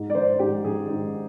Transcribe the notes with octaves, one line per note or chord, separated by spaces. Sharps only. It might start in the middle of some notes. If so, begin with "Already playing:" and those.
Already playing: G#2
D5
D#3 C5
G#2 G4
D#3 G#4
G#2